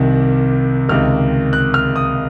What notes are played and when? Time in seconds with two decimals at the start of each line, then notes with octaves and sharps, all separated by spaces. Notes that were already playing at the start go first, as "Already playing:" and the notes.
Already playing: C2 C3 D#3
0.89 C#2 C3 D#3 F6
1.53 F#6
1.74 F6
1.96 D#6